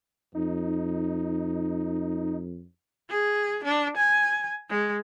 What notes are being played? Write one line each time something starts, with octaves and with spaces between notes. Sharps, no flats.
F2 D#4
G#4
D4
G#5
G#3